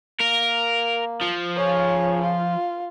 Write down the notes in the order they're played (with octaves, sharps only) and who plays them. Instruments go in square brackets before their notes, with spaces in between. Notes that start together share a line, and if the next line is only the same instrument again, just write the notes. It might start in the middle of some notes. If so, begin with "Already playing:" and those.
[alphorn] A#3 [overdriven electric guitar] A#4
[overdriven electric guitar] F3
[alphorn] C#3 [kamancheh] C#5
[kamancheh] F4